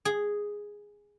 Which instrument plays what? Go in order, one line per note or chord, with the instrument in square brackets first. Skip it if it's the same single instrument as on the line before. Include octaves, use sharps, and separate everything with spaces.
[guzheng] G#4